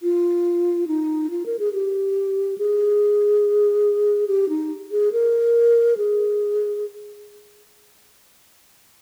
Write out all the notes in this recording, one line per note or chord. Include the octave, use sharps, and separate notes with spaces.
F4
D#4
F4
A#4
G#4
G4
G#4
G4
D#4
G#4
A#4
G#4